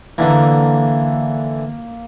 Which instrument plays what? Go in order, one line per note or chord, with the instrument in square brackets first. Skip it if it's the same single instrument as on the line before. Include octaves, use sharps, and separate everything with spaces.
[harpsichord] D3 E3 [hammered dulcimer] A#3